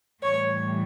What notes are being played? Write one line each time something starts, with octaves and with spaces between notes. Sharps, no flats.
A2 E3 G3 C#5